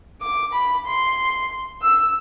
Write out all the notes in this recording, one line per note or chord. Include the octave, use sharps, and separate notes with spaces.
D6
B5
C6
E6